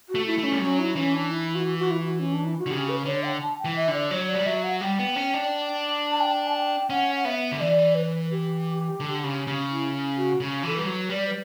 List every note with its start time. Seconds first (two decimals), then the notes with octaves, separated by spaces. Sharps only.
0.09 F#4
0.15 A3
0.26 E4
0.38 A3
0.44 C#4
0.52 G3
0.61 F#3 C#4
0.79 E4
0.96 E3 C#4
1.14 D4
1.31 E4
1.55 F#4
1.78 F#4
1.91 E4
2.05 F#4
2.19 C#4
2.33 D4
2.45 E4
2.59 F#4
2.66 D3
2.70 C#3 G4
2.89 B4
3.05 D3 C#5
3.23 G5
3.41 A5
3.58 G5
3.65 E3
3.76 E5
3.88 D3
3.93 D5
4.11 F#3 C#5
4.28 D5
4.35 G3
4.46 F#3 E5
4.63 F#5
4.81 G3 G5
4.99 B3
5.16 C#4
5.34 D4
6.11 A5
6.21 G5
6.47 A5
6.56 G5
6.90 C#4 F#5
7.15 F#5
7.25 B3 E5
7.52 D3
7.60 E3 D5
7.95 B4
8.31 G4
9.00 D3
9.24 C#3
9.47 C#3
9.71 E4
10.17 F#4
10.40 C#3
10.63 E3 A4
10.75 G3 B4
10.86 F#3
11.09 G3 D5
11.27 B4